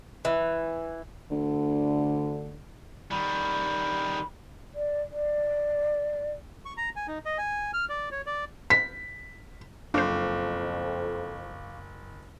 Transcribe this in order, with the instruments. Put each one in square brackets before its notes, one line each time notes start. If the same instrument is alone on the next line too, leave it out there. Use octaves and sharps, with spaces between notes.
[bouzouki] E3
[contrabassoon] D2 [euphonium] D3
[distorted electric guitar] D#3 G3 [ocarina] B5
[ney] D5
D5
[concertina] C#6
A#5
G#5
D#4
D#5
G#5
F6
D5
C#5
D5
[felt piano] B6
[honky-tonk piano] F#1 [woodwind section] F2 [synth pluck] D4 C5 [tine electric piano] F5 C#6 D6